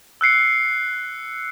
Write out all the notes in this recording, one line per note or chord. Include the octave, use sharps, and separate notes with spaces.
E6 F#6 C7 C#7